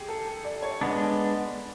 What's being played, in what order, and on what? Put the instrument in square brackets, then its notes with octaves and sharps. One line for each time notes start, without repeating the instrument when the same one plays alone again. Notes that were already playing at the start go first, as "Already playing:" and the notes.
Already playing: [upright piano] G4 G#4
A4
D5
C#5
[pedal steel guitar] G#3 B3 D4 [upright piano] D5